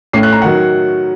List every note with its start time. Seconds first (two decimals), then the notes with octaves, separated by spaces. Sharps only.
0.13 A2 A3 C#4 C7
0.23 F#6
0.32 A#5
0.42 D#3 F#3 F#5